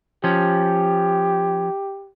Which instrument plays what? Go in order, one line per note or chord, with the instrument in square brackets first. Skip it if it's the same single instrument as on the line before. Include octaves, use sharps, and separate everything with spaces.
[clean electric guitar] F3 C#4 [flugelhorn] G4